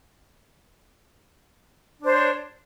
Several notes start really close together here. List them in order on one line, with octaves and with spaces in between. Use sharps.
D4 C5 C#5